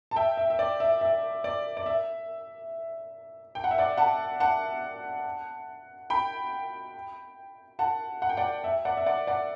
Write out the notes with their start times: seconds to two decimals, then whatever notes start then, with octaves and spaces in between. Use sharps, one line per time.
0.11 A5
0.16 E5 G5
0.37 E5
0.50 E5
0.59 D5
0.80 E5
1.01 E5
1.44 D5
1.77 D5
1.86 E5
3.55 G5
3.64 F#5
3.71 E5
3.78 D5 F#5
3.97 F#5 A5
4.40 F#5 A5
6.10 G5 B5
7.79 F#5 A5
8.22 F#5
8.29 G5
8.37 D5 F#5
8.64 E5
8.85 D5 F#5
8.97 E5
9.06 D5 F#5
9.27 D5 F#5